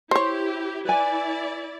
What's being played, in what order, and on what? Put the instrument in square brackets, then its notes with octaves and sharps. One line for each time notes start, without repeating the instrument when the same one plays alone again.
[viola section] E4 G4 [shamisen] C5 C#5
[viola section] E4 D5 [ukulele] B4 G#5